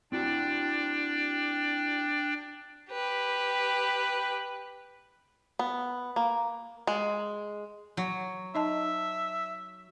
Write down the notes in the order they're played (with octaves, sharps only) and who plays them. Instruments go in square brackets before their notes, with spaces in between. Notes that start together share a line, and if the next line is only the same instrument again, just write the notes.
[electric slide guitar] C4 E4 F#4 [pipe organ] D4 D5 G5
[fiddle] G4 B4
[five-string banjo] B3
A#3
G#3
[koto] F#3
[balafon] D#4 D#5 A5 [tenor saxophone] E5